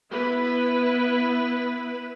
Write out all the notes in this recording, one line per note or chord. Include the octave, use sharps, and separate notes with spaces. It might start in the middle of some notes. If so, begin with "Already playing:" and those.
B3 E4 B4